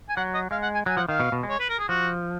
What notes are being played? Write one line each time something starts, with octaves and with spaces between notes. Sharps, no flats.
G#5
F#3 F#5
D#5
G#3 F5
F#5
G#5
F#3 G#5
F3 F#5
D#3 F5
B2
B2
G#3
C#5
B4
A#4
G#4
F3 F#4